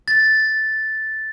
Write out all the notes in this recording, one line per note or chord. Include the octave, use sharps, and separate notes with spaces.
A6